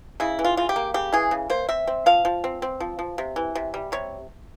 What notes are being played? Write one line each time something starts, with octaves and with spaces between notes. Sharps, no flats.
C#3 E4
E3
F4
C#3 F4
G4
A#3
C#3 G4
E3 G#4
C#3
A#3 C5
C4 E5
C4
F3 F5
F3
C4
C4
F3
F3
C3
E3
C3
G3
C3 C#5